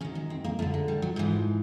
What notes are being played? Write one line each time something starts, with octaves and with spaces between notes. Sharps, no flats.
F#2 D#3 C#4
C#4
C4
A#3
F#2 D3 A3
G#3
G3
F#3
G#2 E3 F3